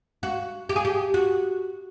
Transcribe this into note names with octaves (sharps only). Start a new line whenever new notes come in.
F#4
G4
G#4
G4
F#4